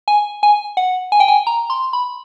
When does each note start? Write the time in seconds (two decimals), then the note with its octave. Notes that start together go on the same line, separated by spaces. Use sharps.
0.08 G#5
0.43 G#5
0.77 F#5
1.12 G#5
1.20 G5
1.28 G#5
1.47 A#5
1.70 C6
1.93 B5